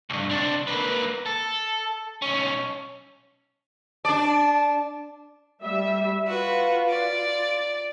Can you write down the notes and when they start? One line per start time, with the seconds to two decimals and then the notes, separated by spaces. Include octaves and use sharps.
0.10 C2 G2
0.29 C3 D4
0.67 A#3 B4
1.26 A4
2.22 B1 C#4
4.05 D4 D5 A5
5.62 G3 E5
6.27 F4 F#4 B4
6.89 D5